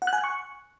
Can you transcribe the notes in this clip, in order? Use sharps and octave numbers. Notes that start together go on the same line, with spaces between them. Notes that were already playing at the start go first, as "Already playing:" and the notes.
F#5
F#6
G#5
F#6
C#6